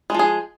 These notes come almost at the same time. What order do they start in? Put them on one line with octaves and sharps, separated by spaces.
G#3 F3 G#4